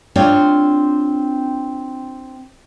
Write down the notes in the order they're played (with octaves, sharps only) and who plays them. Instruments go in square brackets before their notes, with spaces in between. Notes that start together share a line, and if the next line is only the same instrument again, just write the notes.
[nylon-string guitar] C4 D4 F4 C#5